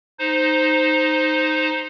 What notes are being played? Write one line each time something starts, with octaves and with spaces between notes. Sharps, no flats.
D#4 C5